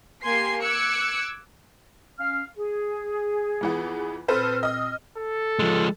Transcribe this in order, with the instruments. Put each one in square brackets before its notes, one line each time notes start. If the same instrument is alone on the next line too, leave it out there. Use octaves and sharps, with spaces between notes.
[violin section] A#3 G4 G#5 C6 G#6 C7
D6 E6 F#6 G#6 C#7
[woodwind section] C#4 F5 F6
G#4
[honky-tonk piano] F2 E3 B3
[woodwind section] A#2 C4 F6 [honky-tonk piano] A4 B4 C5
[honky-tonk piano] D#5 D#6
[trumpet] A4
[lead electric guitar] F3 G#3